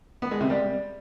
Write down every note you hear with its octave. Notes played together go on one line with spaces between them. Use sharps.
B3
G#3
C3
G3